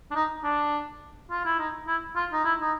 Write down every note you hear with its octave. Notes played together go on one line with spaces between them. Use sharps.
D4
D#4
D4
F4
E4
D#4
E4
F4
D#4
E4
D#4